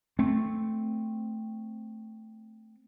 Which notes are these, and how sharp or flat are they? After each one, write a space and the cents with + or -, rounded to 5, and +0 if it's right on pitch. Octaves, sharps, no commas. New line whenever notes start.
A3 +0 C4 +0